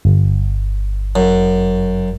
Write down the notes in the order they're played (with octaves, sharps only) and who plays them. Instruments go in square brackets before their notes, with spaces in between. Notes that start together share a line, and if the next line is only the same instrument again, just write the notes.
[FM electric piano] G1
[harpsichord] F#2